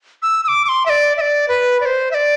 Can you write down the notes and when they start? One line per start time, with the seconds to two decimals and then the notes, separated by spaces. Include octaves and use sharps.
0.22 E6
0.44 E6
0.48 D6
0.65 D6
0.69 C6
0.86 E5
0.90 D5
1.17 E5
1.21 D5
1.48 B4
1.81 D5
1.86 C5
2.11 E5
2.14 D5